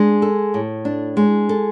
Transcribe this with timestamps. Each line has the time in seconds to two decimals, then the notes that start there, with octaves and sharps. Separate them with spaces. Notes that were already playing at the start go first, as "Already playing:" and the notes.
Already playing: G#3 D4
0.22 A4
0.54 A2
0.85 D4
1.17 G#3
1.49 A4